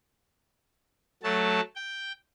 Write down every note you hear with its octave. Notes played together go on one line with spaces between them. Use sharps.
F#3 A3 A5
G5